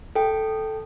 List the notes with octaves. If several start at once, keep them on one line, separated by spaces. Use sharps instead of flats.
A4 G5